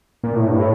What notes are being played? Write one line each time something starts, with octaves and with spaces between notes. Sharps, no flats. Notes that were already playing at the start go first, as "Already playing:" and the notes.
A#2
A2
G2
A2